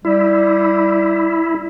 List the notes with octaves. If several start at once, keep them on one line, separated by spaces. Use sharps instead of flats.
G3 E4